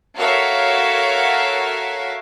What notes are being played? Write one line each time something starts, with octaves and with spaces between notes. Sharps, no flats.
F#4 A4 A#4 C#5 E5 F5